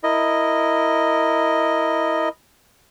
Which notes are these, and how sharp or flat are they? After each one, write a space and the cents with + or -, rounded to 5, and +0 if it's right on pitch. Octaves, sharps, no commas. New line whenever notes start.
E4 +0 A#4 -15 D#5 +0